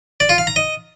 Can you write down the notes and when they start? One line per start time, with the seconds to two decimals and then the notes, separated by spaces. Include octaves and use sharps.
0.20 D5
0.29 F4
0.38 F5
0.47 A#5
0.56 D#5